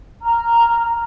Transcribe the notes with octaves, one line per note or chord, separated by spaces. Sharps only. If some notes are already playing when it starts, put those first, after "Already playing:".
A#5 F6